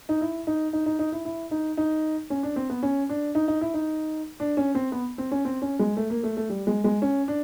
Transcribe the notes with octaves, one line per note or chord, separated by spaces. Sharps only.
D#4
E4
D#4
D#4
D#4
D#4
E4
E4
D#4
D#4
C#4
D4
C4
B3
C#4
D4
D#4
D#4
E4
D#4
D4
C#4
C4
B3
C4
C#4
C4
C#4
G#3
A3
A#3
A3
A3
G3
G#3
G#3
C#4
D4